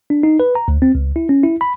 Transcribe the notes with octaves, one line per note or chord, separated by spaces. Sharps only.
D4
D#4
B4
A#5
D2
C4
C#2
E4
C#4
E4
B5